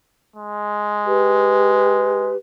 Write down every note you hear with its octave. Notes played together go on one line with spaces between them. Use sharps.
G#3
G4 B4